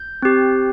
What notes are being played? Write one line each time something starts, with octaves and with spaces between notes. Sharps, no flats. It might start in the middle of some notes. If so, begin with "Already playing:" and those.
Already playing: G6
C4 G4